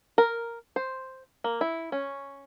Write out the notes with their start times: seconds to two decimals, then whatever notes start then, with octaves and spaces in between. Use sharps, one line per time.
0.18 A#4
0.76 C5
1.44 A#3
1.61 E4
1.92 C#4